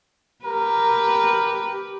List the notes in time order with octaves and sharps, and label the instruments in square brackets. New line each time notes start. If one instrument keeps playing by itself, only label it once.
[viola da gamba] G4 B4 [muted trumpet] A#4